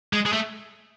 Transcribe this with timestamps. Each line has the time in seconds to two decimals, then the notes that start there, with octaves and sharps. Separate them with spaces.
0.13 G#3
0.26 G#3
0.33 A3